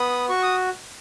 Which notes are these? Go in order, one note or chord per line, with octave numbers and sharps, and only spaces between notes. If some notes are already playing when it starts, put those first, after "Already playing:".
Already playing: B3 B5 D#6
F#4 C#6
D#6